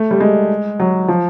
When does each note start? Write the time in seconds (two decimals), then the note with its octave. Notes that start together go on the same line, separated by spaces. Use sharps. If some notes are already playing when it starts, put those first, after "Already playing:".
Already playing: A3
0.11 G3
0.20 G#3
0.80 F#3
1.08 F3